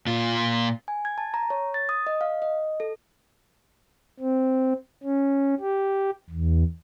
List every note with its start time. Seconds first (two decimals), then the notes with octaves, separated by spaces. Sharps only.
0.07 A#2 F4
0.88 G#5
1.05 G#6
1.18 A5
1.34 A#5
1.50 C#5
1.74 A6
1.89 D#6
2.07 D#5
2.21 F5
2.42 D#5
2.80 A4
4.20 C4
5.04 C#4
5.60 G4
6.30 E2